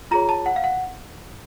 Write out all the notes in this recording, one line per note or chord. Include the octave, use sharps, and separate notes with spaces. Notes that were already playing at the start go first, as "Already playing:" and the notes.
F4 G#4 C#5 A#5
A5
F#5
F5
F#5